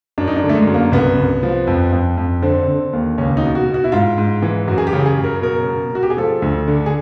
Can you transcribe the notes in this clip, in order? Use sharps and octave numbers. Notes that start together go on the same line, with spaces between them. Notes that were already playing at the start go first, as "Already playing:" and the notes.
F#2 D4
D#4
D4
D3
A3
G#3
F#2
A#3
C2 B3
C2
F3
F2
F2
F2
D3 C4
D3
D#2
C#2 C#4
D#4
B2
F#4
B2
F#4
E4
G#2 F4
G#2
E3
F#2 F#4
G#4
G4
C#3
G#4
F#2
A#4
B2 A#4
B2
B2 F#4
G4
G#4
F3 A4
D2
D3
G#4